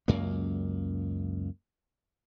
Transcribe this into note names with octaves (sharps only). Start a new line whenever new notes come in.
C#2 F#2 A#3